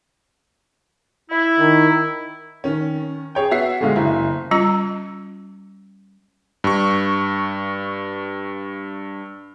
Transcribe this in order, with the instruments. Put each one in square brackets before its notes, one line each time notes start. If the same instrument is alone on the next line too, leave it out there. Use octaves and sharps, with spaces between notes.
[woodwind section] E4
[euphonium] D#3
[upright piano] D#3 C#4
G#4 C#5 G5
B3 F#4 E5 C7
G1 D3 G#3 F5
F#1 E4
[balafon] G3 C#4 F4 A#5
[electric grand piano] G2 C#6